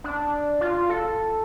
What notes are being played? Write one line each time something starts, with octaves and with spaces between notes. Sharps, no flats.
D4
F4
A4